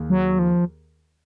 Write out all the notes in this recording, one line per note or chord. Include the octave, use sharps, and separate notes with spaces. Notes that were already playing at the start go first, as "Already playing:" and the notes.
Already playing: D#2 D#3 A#3 G#4
F#3
F3